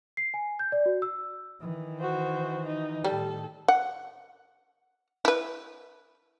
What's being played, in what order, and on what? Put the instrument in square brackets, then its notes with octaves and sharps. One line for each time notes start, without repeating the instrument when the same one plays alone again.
[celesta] C7
G#5
G6
D5
F#4
E6
[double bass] D#3 E3
[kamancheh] F#4 C5
D#4
[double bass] A2 D#3 [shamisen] G3 [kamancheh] A4
[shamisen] F#5
E4 B4